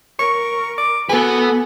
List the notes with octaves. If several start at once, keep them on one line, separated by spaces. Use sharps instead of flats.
A#4 C#6
D6
B3 F#4 A4 B4 G#5